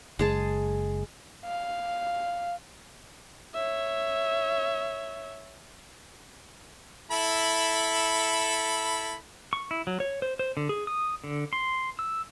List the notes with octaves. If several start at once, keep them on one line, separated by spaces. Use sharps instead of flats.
F#1 G#3 G#4 A5
F5
C#5 E5
E4 A4 B5
C#6
E4
F#3
C#5
C5
C5
D3
G#4
D#6
D3
C6
E6